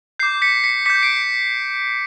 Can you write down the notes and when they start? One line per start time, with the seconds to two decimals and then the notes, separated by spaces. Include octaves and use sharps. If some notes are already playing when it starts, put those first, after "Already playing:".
0.19 D6 G6 C7
0.42 B6 C#7
0.64 B6 C#7
0.86 D6 G6 B6 C#7
1.03 C7 D7